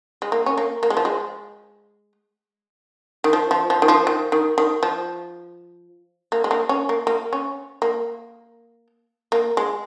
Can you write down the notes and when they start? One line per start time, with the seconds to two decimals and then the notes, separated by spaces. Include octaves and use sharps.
0.22 G#3
0.32 A#3
0.46 C#4
0.58 A#3
0.83 A#3
0.90 G#3
0.97 F3
1.05 G#3
3.24 D#3
3.33 F3
3.51 F3
3.70 F3
3.82 D#3
3.88 F3
4.07 D#3
4.32 D#3
4.58 D#3
4.83 F3
6.32 A#3
6.44 G#3
6.51 A#3
6.69 C#4
6.89 A#3
7.07 A#3
7.33 C#4
7.82 A#3
9.32 A#3
9.57 G#3